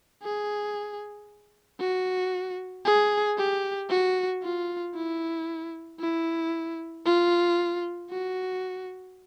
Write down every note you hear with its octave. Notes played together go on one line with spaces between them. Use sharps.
G#4
F#4
G#4
G4
F#4
F4
E4
E4
F4
F#4